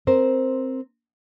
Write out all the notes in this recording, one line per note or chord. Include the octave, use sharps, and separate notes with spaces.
C4 A#4 C5